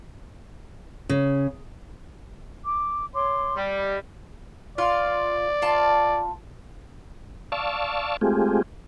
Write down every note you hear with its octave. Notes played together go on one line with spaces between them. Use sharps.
C#3
D6
C#5 C6 D6
G3
D#5 B5
F4 D5
F4 A5
D5 F5 A5 C#6 E6
G#3 A3 C4 F4 G4 G#4